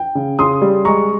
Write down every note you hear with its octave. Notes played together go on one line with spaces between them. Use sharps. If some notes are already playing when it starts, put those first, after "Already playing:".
Already playing: G5
C#3
C#3 C6 D#6
G3
G#3 A#5 C#6